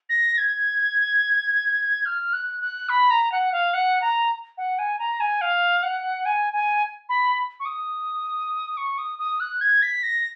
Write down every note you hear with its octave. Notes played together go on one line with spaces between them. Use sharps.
A#6
G#6
F6
F#6
F#6
B5
A#5
F#5
F5
F#5
A#5
F#5
G#5
A#5
G#5
F5
F#5
G#5
G#5
B5
C#6
D#6
C#6
D#6
D#6
F#6
G#6
B6
A#6